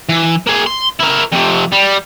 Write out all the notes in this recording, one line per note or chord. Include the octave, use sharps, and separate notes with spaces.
E3
A#3 G#4
C6
E4 A#4
F2 C3
G3